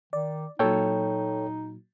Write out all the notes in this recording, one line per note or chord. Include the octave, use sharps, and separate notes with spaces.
D#3 D5
A#2 F#3 D#4 A4 C#5 G5